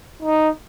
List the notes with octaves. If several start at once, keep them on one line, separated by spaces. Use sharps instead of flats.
D#4